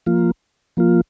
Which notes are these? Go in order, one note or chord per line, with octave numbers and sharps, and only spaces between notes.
F3 A#3 F4
F3 A#3 F4